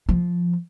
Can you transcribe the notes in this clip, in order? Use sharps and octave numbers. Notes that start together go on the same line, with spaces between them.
F3